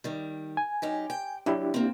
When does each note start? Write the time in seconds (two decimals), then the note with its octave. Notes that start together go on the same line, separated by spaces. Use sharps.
0.04 D#3 G3
0.57 G#5
0.82 F#2 D#4 G4
1.10 G5
1.46 F#3 D4 E4 G4
1.74 A#3 C4